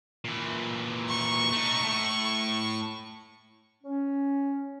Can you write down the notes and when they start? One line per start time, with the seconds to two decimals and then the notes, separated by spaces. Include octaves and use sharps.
0.25 A#2 E3
1.09 C#6
1.53 A3 D#4
1.83 A2
3.83 C#4